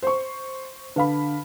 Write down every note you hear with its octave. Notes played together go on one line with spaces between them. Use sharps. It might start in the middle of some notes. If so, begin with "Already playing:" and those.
C5 C#6
D3 B4 F5 B5